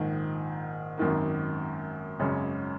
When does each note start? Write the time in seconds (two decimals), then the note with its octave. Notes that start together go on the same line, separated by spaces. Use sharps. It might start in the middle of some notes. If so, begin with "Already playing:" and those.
Already playing: A#1 G#2 D#3
0.98 G#1 F#2 D#3 A#3
2.19 G#1 F#2 C#3 G#3 C#4